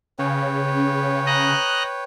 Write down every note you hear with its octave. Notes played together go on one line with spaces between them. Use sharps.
C#3 B4 C#5 G5
D#5 A#5 F#6